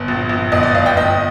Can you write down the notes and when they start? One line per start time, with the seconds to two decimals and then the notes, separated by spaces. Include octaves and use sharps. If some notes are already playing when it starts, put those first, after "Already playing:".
Already playing: G1
0.08 A#1
0.29 A#1
0.52 G1 D#5
0.63 D5
0.74 G1 F5
0.86 G5
0.96 G1 D#5